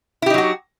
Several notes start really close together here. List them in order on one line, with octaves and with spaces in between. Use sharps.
E4 G4 D#4 F#3 F#4